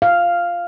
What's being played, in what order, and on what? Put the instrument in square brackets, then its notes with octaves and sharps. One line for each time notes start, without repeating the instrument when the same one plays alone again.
[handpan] F5